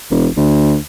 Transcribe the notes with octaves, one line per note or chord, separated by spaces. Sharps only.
E1
D2